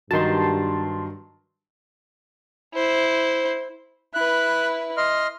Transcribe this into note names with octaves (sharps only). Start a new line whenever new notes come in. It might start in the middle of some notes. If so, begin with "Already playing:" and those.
G2 D#3 F#3 A5 C6
E4 C5
E4 B4 F#6
D#5 C6 F6